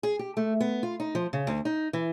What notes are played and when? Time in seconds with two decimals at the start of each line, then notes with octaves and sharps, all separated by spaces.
0.03 G#4
0.19 G4
0.37 A3
0.60 B3
0.83 F4
1.00 D#4
1.15 F3
1.33 C#3
1.47 D2
1.65 D#4
1.93 E3